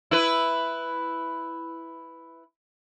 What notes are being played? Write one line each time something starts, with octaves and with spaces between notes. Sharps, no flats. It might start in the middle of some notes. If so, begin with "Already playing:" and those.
E4 B4